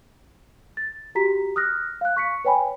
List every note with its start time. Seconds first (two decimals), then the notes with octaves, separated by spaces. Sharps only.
0.77 A6
1.15 F#4 G4 A#5 B6
1.56 D#6 F6 F#6 A#6
2.01 F5 F#6
2.17 C#6 B6 C#7
2.45 B4 C#5 G5 G#5 B5